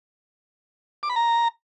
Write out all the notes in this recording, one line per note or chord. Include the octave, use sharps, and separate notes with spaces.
D6
B5
A#5